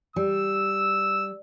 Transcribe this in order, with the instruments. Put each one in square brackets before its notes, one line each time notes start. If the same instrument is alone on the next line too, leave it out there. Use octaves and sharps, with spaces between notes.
[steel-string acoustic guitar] G3 [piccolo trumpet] E6